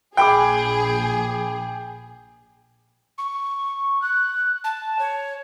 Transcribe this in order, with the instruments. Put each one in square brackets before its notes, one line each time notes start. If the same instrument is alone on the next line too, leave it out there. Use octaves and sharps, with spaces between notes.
[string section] A#1 G#4 [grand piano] G5 B5 D6
[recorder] C#6
F#6
A5
C#5